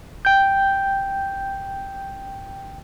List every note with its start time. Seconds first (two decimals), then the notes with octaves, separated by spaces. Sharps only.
0.25 G5 G6